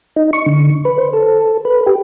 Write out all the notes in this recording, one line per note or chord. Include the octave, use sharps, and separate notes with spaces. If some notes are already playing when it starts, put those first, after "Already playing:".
D#4
C#6
D3
B4
C5
A4
B4
G4